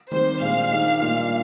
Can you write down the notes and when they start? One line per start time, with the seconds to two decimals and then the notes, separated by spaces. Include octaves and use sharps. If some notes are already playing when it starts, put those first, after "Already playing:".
0.11 D#3 G3 C4 G4 C5
0.41 A#2 G#3 D4 F5
0.71 D#3 G#3 D#4 G4
1.00 A#2 G3 A#3 D4 F4